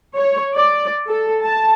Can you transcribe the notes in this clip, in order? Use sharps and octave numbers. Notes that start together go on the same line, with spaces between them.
C#5
D5
A4
A5